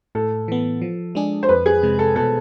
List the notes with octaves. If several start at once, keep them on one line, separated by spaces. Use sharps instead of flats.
A2 A4
E3 B3
F3
G#3 D4 G#4
C5
F2 B4
G#4
C3 G#3
A4
B2 A4